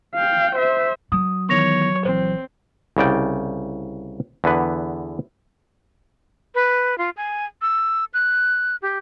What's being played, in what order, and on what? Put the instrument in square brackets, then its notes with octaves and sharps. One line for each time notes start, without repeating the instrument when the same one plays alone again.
[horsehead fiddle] F5 G5
C5 E5
[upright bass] F#3 [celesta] D#6
[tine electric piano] D#3 E3 B3 [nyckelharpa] C#5 [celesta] C#6 A#6 F7
[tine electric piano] A#1 E3 [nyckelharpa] C4 [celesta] C5
[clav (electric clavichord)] C2 C#3 D5 G5
E2 D3 B3 B4
[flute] B4
F4
G#5
E6
F#6
G4